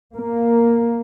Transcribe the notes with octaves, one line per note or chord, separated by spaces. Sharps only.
A#3